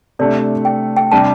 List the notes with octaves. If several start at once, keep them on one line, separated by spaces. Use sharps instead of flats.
C3 A3 D4 D5
G5
G5
C3 G3 D4 A5